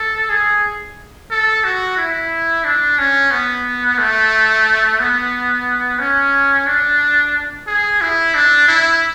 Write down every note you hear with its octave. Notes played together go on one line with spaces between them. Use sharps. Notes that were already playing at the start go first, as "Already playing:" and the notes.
Already playing: A4
G#4
A4
F#4
E4
D4
C#4
B3
A3
B3
C#4
D4
G#4
E4
D4
E4